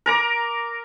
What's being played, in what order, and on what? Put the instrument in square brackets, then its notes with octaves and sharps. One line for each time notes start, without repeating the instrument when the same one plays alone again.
[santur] A#4 A#5 D6